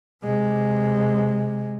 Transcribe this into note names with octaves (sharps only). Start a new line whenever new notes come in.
C3 G#3